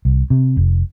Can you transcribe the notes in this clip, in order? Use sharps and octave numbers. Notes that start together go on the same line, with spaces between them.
C2
C3
F1